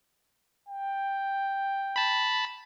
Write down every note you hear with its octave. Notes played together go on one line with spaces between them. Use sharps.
G5
A5 B5